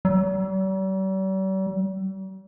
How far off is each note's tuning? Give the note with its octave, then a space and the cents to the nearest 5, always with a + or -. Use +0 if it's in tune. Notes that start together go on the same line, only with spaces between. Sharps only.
G3 -45